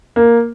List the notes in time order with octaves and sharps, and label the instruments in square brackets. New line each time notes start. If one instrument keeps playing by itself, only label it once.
[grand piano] A#3